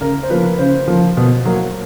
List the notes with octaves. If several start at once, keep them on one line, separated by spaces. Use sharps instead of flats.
C#3 A#4
C5
F3 A#3 B4
C#3 C5
F3 A#3
B2
F#3 A#3